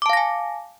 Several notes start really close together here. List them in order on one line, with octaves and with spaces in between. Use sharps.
D6 A5 F5 A#6 G#5